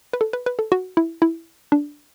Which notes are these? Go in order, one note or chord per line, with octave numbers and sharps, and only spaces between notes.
B4
A4
B4
B4
A4
F#4
E4
E4
D4